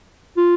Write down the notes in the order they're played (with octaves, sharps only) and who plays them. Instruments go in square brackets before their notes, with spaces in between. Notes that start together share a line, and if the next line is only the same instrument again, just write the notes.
[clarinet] F4